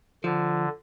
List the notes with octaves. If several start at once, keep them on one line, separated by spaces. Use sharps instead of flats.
D3 F3